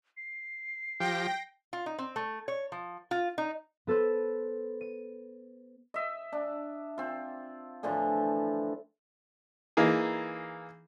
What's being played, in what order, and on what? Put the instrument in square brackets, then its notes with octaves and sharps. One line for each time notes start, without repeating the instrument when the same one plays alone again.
[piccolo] C7
[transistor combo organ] F3 G4 [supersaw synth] G5 A#6
[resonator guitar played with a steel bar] F4
D#4
C4
A3
C#5
F3
F4
D#4
[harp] B3 A4 B4 C5
D#7
[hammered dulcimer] D#5 E5
D4
C4 F4
A2 D3 E3 F3
[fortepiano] E3 A#3 D#4 G#4